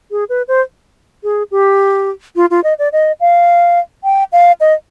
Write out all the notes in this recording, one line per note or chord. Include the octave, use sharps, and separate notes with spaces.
G#4
B4
C5
G#4
G4
F4
F4
D#5
D5
D#5
F5
G5
F5
D#5